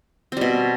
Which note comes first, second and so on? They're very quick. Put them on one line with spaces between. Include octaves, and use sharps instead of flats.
C4 G3 B2